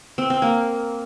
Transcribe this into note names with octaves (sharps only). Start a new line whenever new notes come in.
C4
C4
A#3